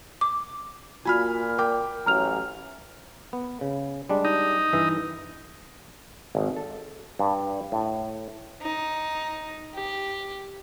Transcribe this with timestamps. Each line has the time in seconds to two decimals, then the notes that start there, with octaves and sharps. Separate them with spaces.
0.21 D6
1.05 A#2 F4 F#4 G#5 B5 F6
1.58 A#4 G5 D6
2.06 A1 F#3 A#5 F6 F7
3.33 B3
3.61 C#3
4.10 G3 G#3 D4
4.25 D#4
4.73 G2 E3 E5
6.35 G#1
6.56 A4
7.19 G2
7.72 A2
8.62 D#4
9.74 G4